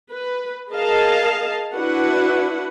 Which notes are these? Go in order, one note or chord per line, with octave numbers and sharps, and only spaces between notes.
B4
G#4 A#4 D#5 F5 A5
D4 E4 F#4 B4 F#5